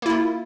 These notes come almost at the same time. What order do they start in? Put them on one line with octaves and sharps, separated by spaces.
A#3 E4 F4